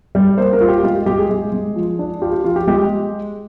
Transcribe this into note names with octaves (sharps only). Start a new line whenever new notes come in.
G3
A#3 C5
A#4
F4
G4
G#3 F4
G4
G#3 G4
G#4
G#3
G#3
F3
D4
F4 G4
G4
F3 F4
G4
G#3 G4